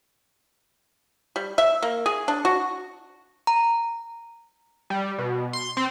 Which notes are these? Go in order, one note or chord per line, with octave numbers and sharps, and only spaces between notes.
G3
E5
A#3
G#4
D4
F#4
A#5
G3
B2
C6
C4